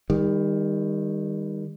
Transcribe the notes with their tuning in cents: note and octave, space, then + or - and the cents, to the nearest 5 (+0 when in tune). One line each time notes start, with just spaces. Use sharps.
D#3 +10 G3 +40